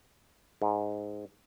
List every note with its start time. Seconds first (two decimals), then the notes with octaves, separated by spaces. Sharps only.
0.62 G#2